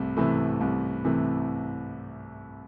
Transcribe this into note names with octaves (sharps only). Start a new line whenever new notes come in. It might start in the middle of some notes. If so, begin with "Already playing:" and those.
Already playing: C2 C3 A3
C3 E3 A3
C2
C3 E3 A3